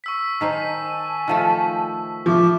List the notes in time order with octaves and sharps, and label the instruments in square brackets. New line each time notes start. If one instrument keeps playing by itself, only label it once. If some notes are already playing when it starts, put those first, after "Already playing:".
[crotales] C#6 E6 B6
[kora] D#3 D#4 C5 [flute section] G#5 A5 [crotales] B6
[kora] D#3 F3 A3
[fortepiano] F3 [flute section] E5 C#6 D6